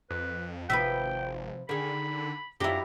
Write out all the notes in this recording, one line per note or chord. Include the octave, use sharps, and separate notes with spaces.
F2 B4
G#1 C3 F3 B4 E5 G5
D3 D#3 G#4 B5
F#2 F3 D4 E4 G4 A#5